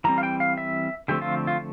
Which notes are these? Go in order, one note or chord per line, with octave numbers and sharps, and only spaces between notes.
E3 G3 C4 A#5
F5
G5
F5
E5
D3 F3 A3 C4 G4
F4
F4